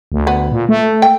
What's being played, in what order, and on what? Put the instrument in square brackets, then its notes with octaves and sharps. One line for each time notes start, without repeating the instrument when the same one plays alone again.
[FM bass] D2
[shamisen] B3
[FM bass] A#2
A3
[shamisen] G5